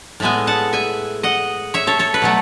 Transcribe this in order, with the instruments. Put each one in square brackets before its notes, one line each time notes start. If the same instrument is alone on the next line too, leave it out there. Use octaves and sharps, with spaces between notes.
[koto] A2 G#3 B3 E5 G#5
F#5 A5
E5 G#5
D#5 F#5
C#5 E5
A4 C#5
A4 C#5
B4
B2 F#3 A3